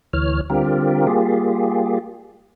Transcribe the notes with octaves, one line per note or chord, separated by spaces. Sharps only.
D2 E3 C#5 F6
D3 G3 C4 F4 G4 A#4
G3 A#3 F4 G4 G#4